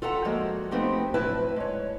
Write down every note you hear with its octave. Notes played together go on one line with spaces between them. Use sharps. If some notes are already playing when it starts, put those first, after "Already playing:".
F4 A4 E5 F#5 G#5 A#5
F3 G#3 A#3 F#4
F3 A3 B3 C4 D#4 G4
F#2 A2 F3 E4 B4 A5
G#3 C#5